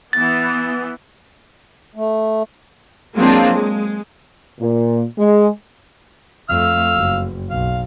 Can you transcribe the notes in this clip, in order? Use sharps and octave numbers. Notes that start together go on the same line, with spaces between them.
E3 B3 A6
A3
F#3 G#3 A#3 C4 D4 F4
G#3
A#2
G#3
F2 A3 F5 E6 F6
F#1
B1 F5